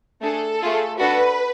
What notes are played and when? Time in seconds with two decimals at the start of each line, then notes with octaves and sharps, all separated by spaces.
0.21 A3 D4 G#4 A4
0.61 A3 F4 G#4
0.98 D4 F#4 A4 B4